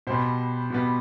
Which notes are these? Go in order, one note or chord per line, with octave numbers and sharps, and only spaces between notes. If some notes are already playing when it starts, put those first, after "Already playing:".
B2 G3 B3 C5
B2 G3 B3